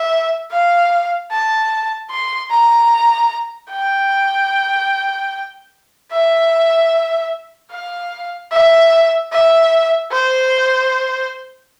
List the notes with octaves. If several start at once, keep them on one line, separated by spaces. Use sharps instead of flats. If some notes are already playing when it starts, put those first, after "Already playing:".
Already playing: E5
F5
A5
C6
A#5
G5
E5
F5
E5
E5
C5